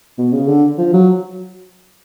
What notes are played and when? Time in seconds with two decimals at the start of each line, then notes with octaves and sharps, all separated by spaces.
0.18 B2
0.33 C#3
0.48 D3
0.78 F3
0.93 F#3